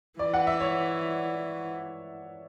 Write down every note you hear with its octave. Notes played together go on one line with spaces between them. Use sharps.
E3 D5
F#5
E5
C#5